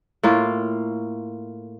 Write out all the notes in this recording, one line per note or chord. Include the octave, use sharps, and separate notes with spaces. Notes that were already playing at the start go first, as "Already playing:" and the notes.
A2 A#3 F4